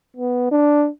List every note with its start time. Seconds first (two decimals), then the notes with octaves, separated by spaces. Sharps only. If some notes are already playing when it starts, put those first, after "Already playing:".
0.17 B3
0.51 D4